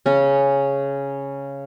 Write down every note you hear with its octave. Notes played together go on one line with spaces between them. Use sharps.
C#3 C#4